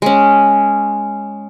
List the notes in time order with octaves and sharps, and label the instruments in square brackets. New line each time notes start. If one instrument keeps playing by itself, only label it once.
[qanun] G#3 C#4